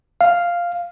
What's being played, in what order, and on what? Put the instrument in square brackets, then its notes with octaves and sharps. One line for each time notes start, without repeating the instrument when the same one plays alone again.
[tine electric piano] F5